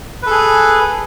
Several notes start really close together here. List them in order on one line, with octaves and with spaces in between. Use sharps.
B4 A4 G#4